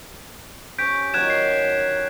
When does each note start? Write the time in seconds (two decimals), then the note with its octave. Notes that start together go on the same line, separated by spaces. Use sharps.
0.78 C#4 G4 C#5 G6 B6 D7
1.14 D#3 F#3 F#6 G#6 E7
1.30 C7